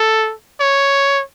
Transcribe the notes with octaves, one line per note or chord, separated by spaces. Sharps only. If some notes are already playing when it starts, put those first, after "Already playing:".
Already playing: A4
C#5